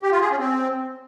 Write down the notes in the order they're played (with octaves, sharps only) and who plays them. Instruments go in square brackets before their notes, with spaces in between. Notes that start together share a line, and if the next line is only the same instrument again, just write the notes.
[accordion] G4
F4
G#4
C#4
C4